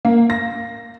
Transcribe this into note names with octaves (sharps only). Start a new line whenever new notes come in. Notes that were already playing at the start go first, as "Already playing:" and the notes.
A#3
A#6